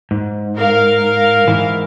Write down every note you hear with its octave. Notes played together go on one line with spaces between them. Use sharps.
G#2
A#4 F5
G#2 E3